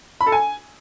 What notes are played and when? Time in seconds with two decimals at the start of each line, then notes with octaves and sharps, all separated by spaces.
0.21 B5
0.26 A4
0.32 G#5